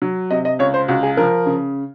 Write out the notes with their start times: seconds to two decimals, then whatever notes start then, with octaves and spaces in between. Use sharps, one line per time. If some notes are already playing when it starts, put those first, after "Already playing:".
0.02 F#3
0.31 C3 D#5
0.45 D#5
0.59 C#2 C#5
0.74 C5
0.88 C#2 F#4
1.03 G#4
1.17 F3 A#4
1.46 C#3